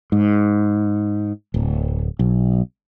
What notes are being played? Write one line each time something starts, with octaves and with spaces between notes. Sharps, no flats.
G#2
D1
B1